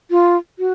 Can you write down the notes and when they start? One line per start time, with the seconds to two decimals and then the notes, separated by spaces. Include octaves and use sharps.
0.11 F4
0.59 F#4